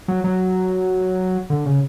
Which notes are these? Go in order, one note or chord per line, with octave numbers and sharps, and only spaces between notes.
F#3
F#3
D3
C#3